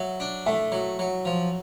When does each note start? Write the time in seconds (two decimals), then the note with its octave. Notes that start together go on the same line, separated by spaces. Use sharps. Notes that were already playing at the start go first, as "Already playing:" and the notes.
Already playing: F#3 E5
0.20 D4
0.46 A3 E5
0.72 F#3
0.99 F#3
1.25 F3